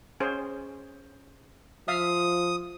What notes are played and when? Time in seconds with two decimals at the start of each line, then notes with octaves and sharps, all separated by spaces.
0.20 C#4 G#4 C5
1.88 F3 E5 F5 D#6